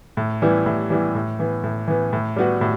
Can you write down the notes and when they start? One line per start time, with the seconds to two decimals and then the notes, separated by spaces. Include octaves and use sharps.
0.17 A2
0.42 E3 G3 B3 E4
0.66 A2
0.90 E3 G3 B3 E4
1.15 A2
1.39 E3 B3
1.64 A2
1.87 E3 B3
2.13 A2
2.36 G3 B3 F#4
2.61 A2